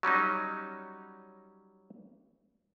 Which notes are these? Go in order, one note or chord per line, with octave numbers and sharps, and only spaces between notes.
F#3 G3 C#4 D#4